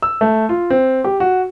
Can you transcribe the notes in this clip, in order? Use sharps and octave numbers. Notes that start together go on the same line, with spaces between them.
E6
A3
F4
C4
G4
F#4